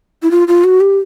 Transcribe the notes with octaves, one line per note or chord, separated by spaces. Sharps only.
E4
F4
F4
F#4
G4